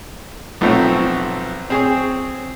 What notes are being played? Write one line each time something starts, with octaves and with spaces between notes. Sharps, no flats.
B1 F3 A3 C4 C#5
C4 G#4 C#5